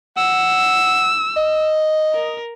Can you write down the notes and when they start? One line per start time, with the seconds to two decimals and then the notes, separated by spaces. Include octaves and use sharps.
0.17 F#5 E6
1.37 D#5
2.14 A#4